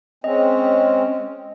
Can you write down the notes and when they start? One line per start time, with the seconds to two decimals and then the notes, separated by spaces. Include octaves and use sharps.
0.24 G#3 C4 C#4 D#5